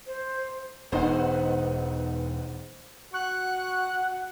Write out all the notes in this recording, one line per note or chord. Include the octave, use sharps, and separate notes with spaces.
C5
E1 B3 D#4 C5 F#5
F#4 F#5 C#6 F#6